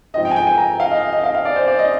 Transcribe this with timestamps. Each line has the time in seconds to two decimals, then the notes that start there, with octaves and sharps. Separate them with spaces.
0.14 G#2 F3 C4 D#4 D#5
0.25 G5
0.31 G#5
0.36 G5
0.47 G#5
0.58 A#5
0.80 F5
0.91 D#5
1.13 D#5
1.23 F5
1.35 F5
1.45 D5
1.56 C5
1.67 D5
1.79 D#5